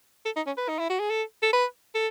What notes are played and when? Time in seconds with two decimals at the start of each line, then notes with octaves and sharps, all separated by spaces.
0.25 A4
0.36 D#4
0.47 C#4
0.57 B4
0.69 D#4
0.79 E4
0.89 F#4
1.00 G#4
1.10 A4
1.43 A4
1.53 B4
1.94 A4